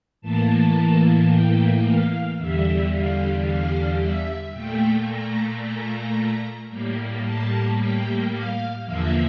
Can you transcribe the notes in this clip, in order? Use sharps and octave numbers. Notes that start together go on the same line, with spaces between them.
A2 E3 A#3 A5
G5
F5
E2 D3 G3 E5
F5
F5
E5
A#2 A3 G5
A#5
A#5
A2 G3 A#3
A5
G5
F5
E2 D3 F3 A#3 E5